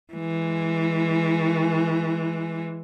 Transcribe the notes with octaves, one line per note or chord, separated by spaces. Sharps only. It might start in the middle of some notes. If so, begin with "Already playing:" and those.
E3 G#3